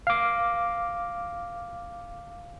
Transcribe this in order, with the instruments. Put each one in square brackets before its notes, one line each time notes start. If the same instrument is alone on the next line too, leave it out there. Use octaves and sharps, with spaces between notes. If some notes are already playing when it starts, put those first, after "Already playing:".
[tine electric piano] F5 D6